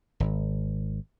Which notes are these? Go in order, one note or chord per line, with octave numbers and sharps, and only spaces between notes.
G#1